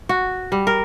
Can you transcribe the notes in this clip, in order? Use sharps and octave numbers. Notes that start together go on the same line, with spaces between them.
F#4
G3
A#4